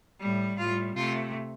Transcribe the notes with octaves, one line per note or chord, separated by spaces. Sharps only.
A2 G3
A2 G3 F4
C3 A3 F4